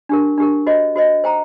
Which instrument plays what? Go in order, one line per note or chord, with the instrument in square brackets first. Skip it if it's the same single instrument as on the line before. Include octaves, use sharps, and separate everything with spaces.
[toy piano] D4 G4 A#4
D4 G4 A#4
F#4 C5 D#5
F#4 C5 D#5
C5 G5 A#5